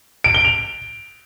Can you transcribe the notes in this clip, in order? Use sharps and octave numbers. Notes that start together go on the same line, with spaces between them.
D7
G7
F7